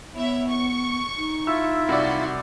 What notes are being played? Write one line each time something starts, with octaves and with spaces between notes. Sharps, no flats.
B3 E4 C#5 E5
C#6
D#4
E4 F4 E5 E6
C2 F#4 D5 C6